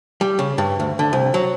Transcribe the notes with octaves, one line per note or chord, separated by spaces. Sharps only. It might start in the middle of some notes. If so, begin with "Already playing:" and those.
G3
C#3
G2
D2
D3
C2
F#3